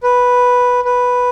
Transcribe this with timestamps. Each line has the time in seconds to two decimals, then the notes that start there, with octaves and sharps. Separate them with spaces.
0.03 B4
0.85 B4